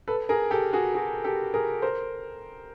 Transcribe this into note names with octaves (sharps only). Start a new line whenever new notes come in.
A4 B4
G#4 A#4
G4 A4
F#4 G#4
F#4 G#4
G4 A4
G#4 A#4
A#4 C5